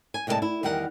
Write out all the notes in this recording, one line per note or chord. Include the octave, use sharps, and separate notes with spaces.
G#5
A2 C3 G#3 A#4 D5 A5
E4
E2 D#3 G3 A#4 F#5